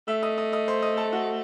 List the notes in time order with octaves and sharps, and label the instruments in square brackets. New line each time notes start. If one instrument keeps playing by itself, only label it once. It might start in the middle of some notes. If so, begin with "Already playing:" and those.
[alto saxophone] A3 [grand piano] E5 E6
[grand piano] D#5 D#6
D#5 D#6
D#5 D#6
C5 C6
D#5 D#6
A4 A5
F#4 F#5